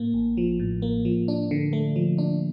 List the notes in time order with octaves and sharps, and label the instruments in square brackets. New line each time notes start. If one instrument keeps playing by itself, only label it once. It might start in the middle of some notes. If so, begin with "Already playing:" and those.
Already playing: [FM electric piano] A2 A#3
A1
F3
A2
A#3
F3
D4
D3
A3
F3
D4